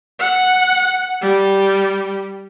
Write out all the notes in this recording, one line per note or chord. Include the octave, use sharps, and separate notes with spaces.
F#5
G3